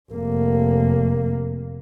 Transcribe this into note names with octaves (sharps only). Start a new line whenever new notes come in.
F1 A#3